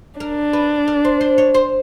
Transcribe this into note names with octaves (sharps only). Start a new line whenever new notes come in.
D4 A#4
B4
A#4
C5
C5
C#5
C5